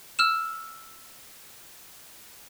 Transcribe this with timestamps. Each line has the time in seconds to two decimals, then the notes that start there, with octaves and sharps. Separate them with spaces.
0.19 E6 F6 E7